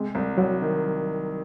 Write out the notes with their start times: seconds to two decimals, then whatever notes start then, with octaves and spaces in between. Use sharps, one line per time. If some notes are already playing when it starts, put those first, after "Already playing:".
Already playing: C3 G#3
0.15 C2
0.38 C2 F#3
0.62 D#3